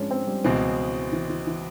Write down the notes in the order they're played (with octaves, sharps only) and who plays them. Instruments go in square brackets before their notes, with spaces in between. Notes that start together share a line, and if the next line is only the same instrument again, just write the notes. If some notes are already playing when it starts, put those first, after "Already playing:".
Already playing: [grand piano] G#2 F3 D4 [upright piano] G#3 C#4
[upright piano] C4
G3
[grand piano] C#2 B2 G#3 C4 [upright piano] E3
[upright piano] E3
E3
E3